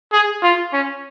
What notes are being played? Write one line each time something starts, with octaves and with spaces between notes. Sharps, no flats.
G#4
F4
C#4